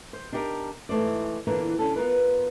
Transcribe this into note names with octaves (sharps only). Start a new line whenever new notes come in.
C5
D4 D#4 G4 G#4 A#4
G#2 E3 A3 C5 D5
A#2 D3 E3 A#3 B3 D4
D3 C#4 A4
B3 F4 A#4 B4